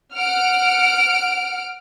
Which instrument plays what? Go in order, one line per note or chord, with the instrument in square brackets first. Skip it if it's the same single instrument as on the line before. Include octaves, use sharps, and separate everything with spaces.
[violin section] F#5 F6 D7